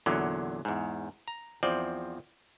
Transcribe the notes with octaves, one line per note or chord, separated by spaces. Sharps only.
E2 A#2 D3 F#3
E2 G#2
A#5
E2 F3 C4 D5